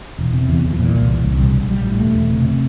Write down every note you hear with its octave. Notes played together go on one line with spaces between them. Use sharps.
E1
C3
E2
E2
F3
A#2 E3
C2
C2
C2
A#1 G3
A#1
A#1 G3
A2
E1 A3
E1
C3
C3